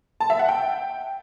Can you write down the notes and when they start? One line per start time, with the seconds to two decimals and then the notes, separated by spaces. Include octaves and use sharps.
0.20 A5
0.30 E5
0.39 F#5
0.49 G5